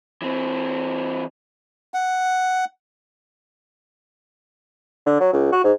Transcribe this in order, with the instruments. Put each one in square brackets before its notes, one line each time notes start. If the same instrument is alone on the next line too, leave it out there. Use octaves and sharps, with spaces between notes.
[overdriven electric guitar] E3 C4
[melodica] F#5
[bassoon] D3
F#3
C#2
F#4
G#2